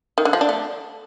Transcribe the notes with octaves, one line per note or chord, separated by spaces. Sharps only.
D#3
D3
F3
D4
A3